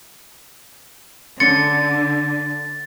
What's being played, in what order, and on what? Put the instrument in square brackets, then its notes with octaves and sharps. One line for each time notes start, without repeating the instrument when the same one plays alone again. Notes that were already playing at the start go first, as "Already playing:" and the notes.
[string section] D3 [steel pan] C#4 C6 [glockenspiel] A6 [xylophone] C#7